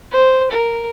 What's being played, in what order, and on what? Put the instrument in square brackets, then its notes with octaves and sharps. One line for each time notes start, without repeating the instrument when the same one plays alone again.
[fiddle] C5
A#4